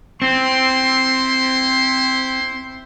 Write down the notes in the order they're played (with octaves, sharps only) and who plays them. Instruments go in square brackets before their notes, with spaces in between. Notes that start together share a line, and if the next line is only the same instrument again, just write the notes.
[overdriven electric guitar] C4 [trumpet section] E4 C5 C6